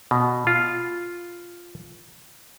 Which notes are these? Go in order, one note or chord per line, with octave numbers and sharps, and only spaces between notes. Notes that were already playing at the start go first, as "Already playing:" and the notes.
B2
F4